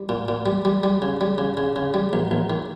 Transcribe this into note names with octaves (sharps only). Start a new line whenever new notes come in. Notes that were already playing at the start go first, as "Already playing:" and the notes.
Already playing: G3
A#2
A#2
G3
G3
G3
C#3
G3
C#3
C#3
C#3
G3
A#1
A#1
D#3